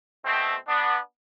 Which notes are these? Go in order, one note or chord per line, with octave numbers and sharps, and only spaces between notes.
B2 A3 C4
B3 D4